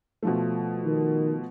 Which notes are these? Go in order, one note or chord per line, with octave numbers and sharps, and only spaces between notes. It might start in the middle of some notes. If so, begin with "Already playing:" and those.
B2 F3 A3
D#3